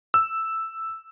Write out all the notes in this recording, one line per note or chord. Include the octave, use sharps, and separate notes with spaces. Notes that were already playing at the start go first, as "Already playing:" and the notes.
E6